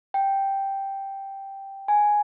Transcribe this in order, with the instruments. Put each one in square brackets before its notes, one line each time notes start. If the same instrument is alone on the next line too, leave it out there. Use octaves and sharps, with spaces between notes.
[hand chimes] G5
G#5